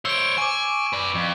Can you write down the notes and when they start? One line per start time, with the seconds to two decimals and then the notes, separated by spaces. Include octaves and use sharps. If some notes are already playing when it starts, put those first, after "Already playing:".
0.05 C5 C#5 E6 D7
0.20 E6 D7
0.38 G#5 C#6 D6
0.93 B4 D5
1.15 F2